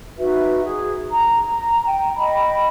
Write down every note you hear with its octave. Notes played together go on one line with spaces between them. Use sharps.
D#4 F#4 B4 E5
G#4
A#5
G5
D#5 G5 B5